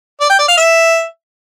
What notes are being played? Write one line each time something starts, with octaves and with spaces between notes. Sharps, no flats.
D5
G5
D5
F5
E5